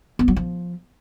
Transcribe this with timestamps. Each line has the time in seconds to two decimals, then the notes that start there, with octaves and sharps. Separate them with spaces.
0.19 B3
0.28 F#3
0.36 F3